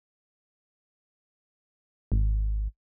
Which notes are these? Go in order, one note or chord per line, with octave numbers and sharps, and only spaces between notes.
G#1